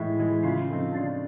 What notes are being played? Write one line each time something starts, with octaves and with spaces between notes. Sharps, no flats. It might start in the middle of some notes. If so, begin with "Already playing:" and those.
Already playing: A2 E3 G#3 E4 E5
E3 G#3
C#3 F4 F5
F3 A3 C4 D#4
C#3 D4 D5